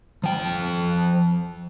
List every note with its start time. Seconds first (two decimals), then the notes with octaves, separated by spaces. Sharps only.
0.24 F3 G5